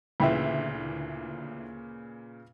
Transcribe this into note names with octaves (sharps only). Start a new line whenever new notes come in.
D2 A#2 C#3 E3 B4 E5 G5 B5